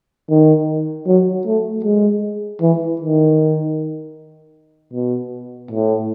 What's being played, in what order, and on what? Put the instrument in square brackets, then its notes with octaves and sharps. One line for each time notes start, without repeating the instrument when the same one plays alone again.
[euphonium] D#3
F#3
A3
G#3
E3
D#3
B2
A2